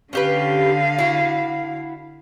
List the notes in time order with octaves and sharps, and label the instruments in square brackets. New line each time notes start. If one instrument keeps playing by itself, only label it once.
[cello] D3 F5 [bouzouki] C#4 G4 B4
[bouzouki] E4 F#4